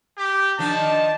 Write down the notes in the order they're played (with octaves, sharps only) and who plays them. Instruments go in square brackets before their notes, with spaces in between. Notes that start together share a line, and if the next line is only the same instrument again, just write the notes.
[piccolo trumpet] G4
[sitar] D#3 F3 D4 [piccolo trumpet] A5